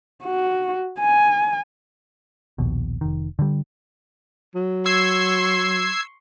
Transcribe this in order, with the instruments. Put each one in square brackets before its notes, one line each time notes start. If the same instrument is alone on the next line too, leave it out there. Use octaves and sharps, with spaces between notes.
[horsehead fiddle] F#4
G#5
[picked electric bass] A#1 D#2 B2
F1 D#3
D3 G3
[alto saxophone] F#3
[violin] C6 C#6 [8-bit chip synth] E6 G#6 C7